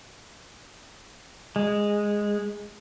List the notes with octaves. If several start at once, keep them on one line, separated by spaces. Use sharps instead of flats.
G#3